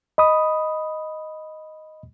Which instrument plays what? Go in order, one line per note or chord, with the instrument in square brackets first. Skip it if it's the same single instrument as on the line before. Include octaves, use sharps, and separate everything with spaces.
[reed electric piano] D#5 B5 D#6